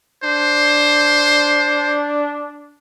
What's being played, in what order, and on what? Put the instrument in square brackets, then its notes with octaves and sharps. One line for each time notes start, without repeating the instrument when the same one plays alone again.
[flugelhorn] D4 [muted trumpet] C5